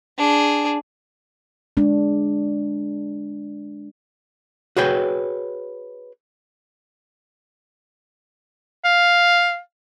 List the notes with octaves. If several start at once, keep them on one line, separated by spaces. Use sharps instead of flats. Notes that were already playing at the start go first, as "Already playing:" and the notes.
D4 G#4
G#3 D4
F#4 G#4 B4 C#5 G5
F5